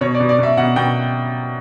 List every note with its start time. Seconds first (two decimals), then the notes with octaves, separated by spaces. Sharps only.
0.01 B2 C#5
0.15 D5
0.20 B2
0.29 D5
0.39 B2 E5
0.57 B2 F#5
0.76 B2 G5